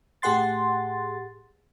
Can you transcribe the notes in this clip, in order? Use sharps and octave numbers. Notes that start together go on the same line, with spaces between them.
A2 G4 G#4 F#5 C6 A6